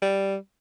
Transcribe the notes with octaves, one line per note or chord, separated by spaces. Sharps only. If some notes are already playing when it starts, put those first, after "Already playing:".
G3